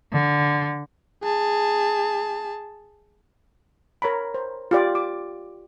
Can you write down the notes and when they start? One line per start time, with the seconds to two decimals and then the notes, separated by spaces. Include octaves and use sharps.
0.13 D3
1.23 G#4 A5
4.02 A#4 C#5 A#5 B5
4.34 C5
4.71 F4 G4 D5
4.95 D6